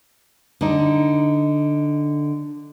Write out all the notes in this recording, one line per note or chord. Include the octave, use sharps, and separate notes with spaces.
D3 D#4